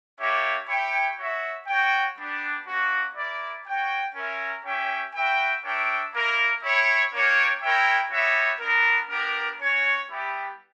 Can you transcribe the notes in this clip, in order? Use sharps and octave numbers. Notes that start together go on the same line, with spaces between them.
A#3 D4 G4 C#5 E5
E4 G4 C#5 G5
F#4 C#5 E5
F#4 C#5 G5
G3 B3 D4
A#3 C#4 F#4
E4 A#4 D5
F#4 C#5 G5
C#4 E4 A#4 E5
C#4 G4 C#5 E5 G5
F#4 B4 E5 G5
D4 A#4 C#5 E5 G5
A#3 E4 A#4
E4 G4 C#5
A#3 D4 A#4 C#5 G5
E4 A#4 C#5 E5 G5
G3 B3 F#4 C#5 E5
B3 D4 A#4
B3 D4 G4 A#4
C#4 F#4 C#5
G3 B3 E4 G4